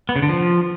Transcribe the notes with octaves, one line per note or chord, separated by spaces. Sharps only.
B3
C#3
D3
F3